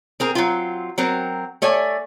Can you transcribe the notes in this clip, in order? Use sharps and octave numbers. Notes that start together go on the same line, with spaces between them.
C4 G#4 A#4
F#3 C4 F4
F#3 C4 A#4
A3 C#5 D5 G#5